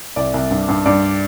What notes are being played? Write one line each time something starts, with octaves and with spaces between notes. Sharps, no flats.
C2 D5
C2
G2
G2
G2 D5